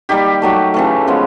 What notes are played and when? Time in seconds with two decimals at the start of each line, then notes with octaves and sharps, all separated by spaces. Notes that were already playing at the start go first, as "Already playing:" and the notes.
0.09 D#3 G3 A#3 G4
0.42 D#3 F#3 A3
0.74 C#3 E3 A3
1.07 C#3 F3 G#3 B3